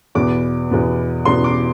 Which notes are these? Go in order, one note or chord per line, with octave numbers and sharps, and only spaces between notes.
E2 B2 B3 D6
E2 B2 B3
E2 B2 B3 C6
D6